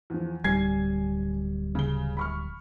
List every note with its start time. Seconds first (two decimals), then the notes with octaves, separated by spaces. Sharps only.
0.10 E2 F3
0.44 D1 G3 G#5 G#6 C7
1.75 C#3 G7
2.17 B5 C#6 F6